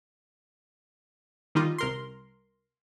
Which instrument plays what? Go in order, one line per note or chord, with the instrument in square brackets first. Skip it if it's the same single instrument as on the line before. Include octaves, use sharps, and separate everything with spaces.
[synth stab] D#3 G3 D#4 F4
C2 A#4 C6